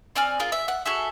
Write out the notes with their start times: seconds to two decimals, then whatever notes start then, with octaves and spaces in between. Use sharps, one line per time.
0.16 C4 D5 G#5 F6
0.40 F4 G#4 A#4
0.52 E5
0.68 F#5
0.86 F#4 G#4 A4 E5